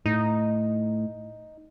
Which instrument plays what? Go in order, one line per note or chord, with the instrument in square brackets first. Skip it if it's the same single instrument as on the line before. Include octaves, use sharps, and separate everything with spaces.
[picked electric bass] A2 [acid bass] D#4